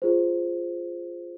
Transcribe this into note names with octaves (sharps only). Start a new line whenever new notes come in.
F4 G#4 C5